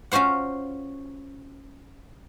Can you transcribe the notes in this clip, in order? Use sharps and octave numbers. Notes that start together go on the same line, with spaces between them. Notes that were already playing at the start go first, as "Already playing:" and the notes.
C#4 F4 F#4 C5 F#5